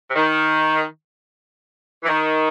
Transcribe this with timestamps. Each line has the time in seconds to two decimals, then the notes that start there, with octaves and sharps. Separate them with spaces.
0.09 C3
0.16 D#3
2.03 E3
2.08 D#3